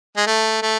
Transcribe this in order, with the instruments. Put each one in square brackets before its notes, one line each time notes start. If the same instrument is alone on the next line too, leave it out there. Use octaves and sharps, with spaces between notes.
[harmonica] G#3
A3
A3